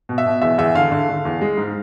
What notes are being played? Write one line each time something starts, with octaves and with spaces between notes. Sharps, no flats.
B2
E5
B2
E2 E5
E2 E5
D3 F5
D3
D3
E2
G#3
G#2